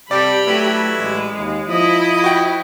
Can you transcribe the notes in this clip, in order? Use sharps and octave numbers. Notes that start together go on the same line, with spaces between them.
C3 G3 G4 A4 D5 B5
F#3 A3 E4 B4
A1 G#3
D#2
F3 E4 D#5 D#6
F#4 G5